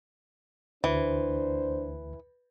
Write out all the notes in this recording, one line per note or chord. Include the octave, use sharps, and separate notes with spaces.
D2 E3 D4 C5